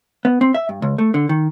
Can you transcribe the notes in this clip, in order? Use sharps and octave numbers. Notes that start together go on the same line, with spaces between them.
B3
C4
E5
G2
C#2
A3
D3
D#3